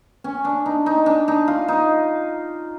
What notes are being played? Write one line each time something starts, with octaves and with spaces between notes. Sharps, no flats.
C#4
D4
D#4
D#4
D4
D#4
F4
D#4